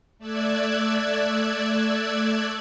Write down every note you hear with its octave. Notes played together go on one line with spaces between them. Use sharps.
A3 D5 E6 F#6 G#6